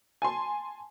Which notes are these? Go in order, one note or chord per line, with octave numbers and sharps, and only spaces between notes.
G#5 A5 C6